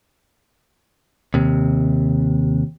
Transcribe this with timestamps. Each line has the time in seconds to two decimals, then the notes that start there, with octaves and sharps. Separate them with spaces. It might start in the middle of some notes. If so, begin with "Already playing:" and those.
1.34 D#2 C3